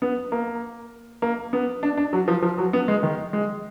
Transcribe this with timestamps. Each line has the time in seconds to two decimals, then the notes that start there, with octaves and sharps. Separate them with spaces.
0.02 B3
0.32 A#3
1.22 A#3
1.53 B3
1.83 D4
1.97 D4
2.13 F#3
2.28 F3
2.42 F3
2.58 F#3
2.73 B3
2.88 G#3
3.03 D#3
3.33 G#3